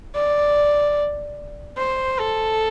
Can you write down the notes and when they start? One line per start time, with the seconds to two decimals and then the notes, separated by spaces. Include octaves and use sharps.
0.15 D5
1.77 C5
2.19 A4